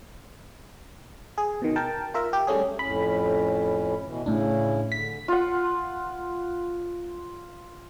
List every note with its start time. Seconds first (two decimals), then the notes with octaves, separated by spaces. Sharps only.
1.38 G#4
1.62 B2 D#3
1.76 A#4 G5 A5
2.14 F4 A#4 E5
2.33 G4
2.47 G3 A3 C#4 G#4
2.79 F2 A2 C#4 B5
4.03 B2 E3
4.26 A2 C#3 C#4 D4 E4
4.92 D3 B6
5.28 F4 F#5